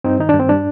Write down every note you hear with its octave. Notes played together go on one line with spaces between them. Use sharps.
G2 C4 D#4
D#3 D#4
D4
G2
C4
G3 D4